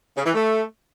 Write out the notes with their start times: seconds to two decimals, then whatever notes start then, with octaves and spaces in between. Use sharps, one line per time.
0.17 C#3
0.26 E3
0.34 A3